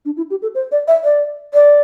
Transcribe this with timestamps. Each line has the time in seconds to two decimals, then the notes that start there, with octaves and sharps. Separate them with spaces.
0.05 D4
0.17 E4
0.30 G4
0.42 A4
0.54 C5
0.72 D5
0.88 E5
1.04 D5
1.54 D5